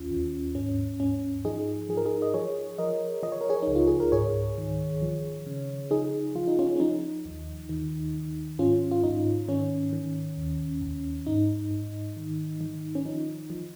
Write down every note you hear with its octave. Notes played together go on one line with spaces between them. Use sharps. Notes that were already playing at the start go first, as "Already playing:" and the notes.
Already playing: D#2 C#4 F4
D#2
G#2 C#4
G#2 C#4
F3 D#4 G#4
F3 G#4
A#4
D#4 G#4
D#5
F3 G#4 C#5
F3 A#4 D#5
F3 D#5
C#5
A#4
G#4 C#5
D#4
C#2
F4
G#4
A#4
G#2 G#4 C#5
D#3
F3
C#3
F3 D#4 G#4
F3 F4
D#4
C#4 F4
C#4
F3 D#4
D#2
D#3
D#3
G#2 C#4 F4
F4
G#2 D#4
D#3 C#4
D#3
D#2
D#2
G#2 D#4
G#2
D#3
D#3
C#4
F3 D#4
F3